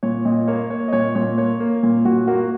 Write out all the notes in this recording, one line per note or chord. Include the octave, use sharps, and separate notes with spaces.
A#2 C#5
A#2 D#5
A#3 C#5
A#3 C#5
D#5
A#2 C#5
A#2 C#5
A#3 C#5
A#3
A#2
A#2 F#4
A#3 F#4